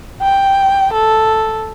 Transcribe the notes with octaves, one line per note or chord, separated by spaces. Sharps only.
G5
A4